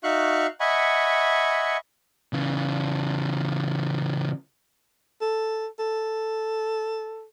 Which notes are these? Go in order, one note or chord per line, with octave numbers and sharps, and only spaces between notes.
D#4 F#4 E5 F5 C#6 F#6
D#5 E5 F#5 G#5 B5 C#6
C#3 E3
A4
A4